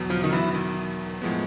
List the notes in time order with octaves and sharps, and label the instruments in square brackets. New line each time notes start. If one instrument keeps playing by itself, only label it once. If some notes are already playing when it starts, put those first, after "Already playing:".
Already playing: [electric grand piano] E2 B2 F#3
[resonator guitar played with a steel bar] F3
D#3
E3
D#3
[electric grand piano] A2 F3 G#3 B3